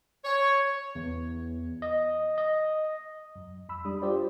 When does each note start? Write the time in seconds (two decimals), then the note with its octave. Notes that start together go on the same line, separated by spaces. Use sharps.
0.25 C#5
0.95 E2
1.82 D#5
2.38 D#5
3.36 F#2
3.69 F2 B5 E6
3.85 G3 D4 D#6
4.02 F4 G4 C5 D5